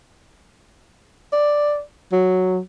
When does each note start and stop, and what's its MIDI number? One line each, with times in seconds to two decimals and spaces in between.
1.33 1.81 74
2.12 2.59 54